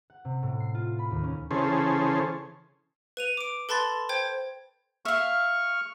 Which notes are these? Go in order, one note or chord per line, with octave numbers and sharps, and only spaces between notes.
F#5
C3
A2
C7
F4
B5
D#2
C#4
C#3 E3 C#4 G#4 A4 C5
B4 D#7 F7
D6 D7
A4 B4 A5 B5 C6 A6
C5 G5 G#6
E5 F5 C#6 F6